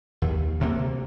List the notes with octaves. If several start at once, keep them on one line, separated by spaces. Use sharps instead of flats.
D#2
D2 C3 A3 A#3